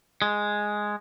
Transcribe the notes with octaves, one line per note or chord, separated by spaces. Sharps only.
G#3